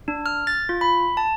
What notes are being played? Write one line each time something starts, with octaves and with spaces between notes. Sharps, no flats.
D4
F6
A6
F4
B5
A5